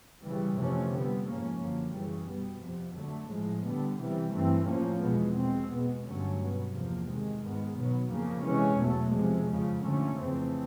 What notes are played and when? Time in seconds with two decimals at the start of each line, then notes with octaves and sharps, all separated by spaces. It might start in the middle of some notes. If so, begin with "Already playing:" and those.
0.23 C#3 E3 G3
0.57 F2 C3 E3 A3 C#4
0.90 D3 G3 B3
1.25 G#2 F3 A#3 C#4
1.59 F#2 D3 F3 A#3
1.93 C#3 E3 G3
2.28 B2 G3 B3
2.62 F2 C3 F3
2.96 D3 F#3 A3
3.31 A2 F3 G#3
3.64 D3 G3 B3
3.99 C3 E3 G3
4.34 G2 E3 A3 C4
4.68 A2 F3 A#3 C#4
5.01 E2 B2 G#3 B3
5.36 B2 G#3 C4
5.71 B2 G#3 B3
6.05 G2 D3 F#3 A3 C#4
6.39 B2 F#3 B3
6.73 E2 C3 F3 A#3
7.08 C3 D#3 G#3
7.42 G#2 D#3 G#3 B3
7.77 B2 F#3 B3
8.10 F2 C#3 F3 A#3
8.44 C3 E3 G#3 C#4
8.79 E2 B2 F#3 A3
9.13 C3 F3 G#3
9.47 F2 C#3 F3
9.83 D3 F3 A3 C#4
10.17 F2 C#3 E3 A3 C4